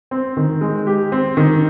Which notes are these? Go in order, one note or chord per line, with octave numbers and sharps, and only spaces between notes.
C4
D#3
G#3
G4
C4
D#3